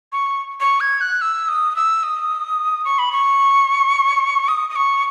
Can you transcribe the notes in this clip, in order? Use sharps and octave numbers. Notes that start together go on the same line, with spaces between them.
C#6
C#6
G#6
F#6
E6
D#6
E6
D#6
C#6
B5
C#6
D#6
D#6
C#6